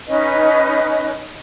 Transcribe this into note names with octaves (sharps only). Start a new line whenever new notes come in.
C#4 D#4 B4 D#5